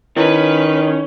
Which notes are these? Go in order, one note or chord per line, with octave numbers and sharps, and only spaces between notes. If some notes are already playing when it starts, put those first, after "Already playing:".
D#3 C#4 E4 B4